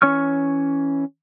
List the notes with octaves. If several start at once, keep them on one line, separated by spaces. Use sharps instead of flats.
E3 C#4 C#5 C#6 F6